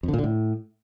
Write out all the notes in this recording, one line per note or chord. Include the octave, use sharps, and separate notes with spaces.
F2
D3
A#2
D3
A2